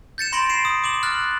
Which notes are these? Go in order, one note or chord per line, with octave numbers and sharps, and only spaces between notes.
G6 A6 C#7 E7
B5 C6 A#6 D7 E7 F#7
C7 D7 E7
D#6
D6 E7 F#7
F6 F#6 A6 F#7